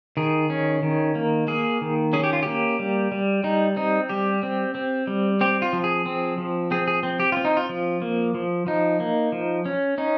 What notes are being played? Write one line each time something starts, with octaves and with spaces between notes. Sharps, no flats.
D#3 G#4
C#4
D#3
A#3
A#3 G#4
D#3
C#4 G#4
G4
F4
A#3 G4
G3
G3
G3 D#4
C4 D#4
G3 G4
C4
C4
G3
C4 G4
F4
F3
G#4
C4
F3
C4 G#4
G#4
C4
G4
C4 F4
D#4
F4
F3
A#3
F3
F3 D#4
A#3
F3
C#4
C#4 D#4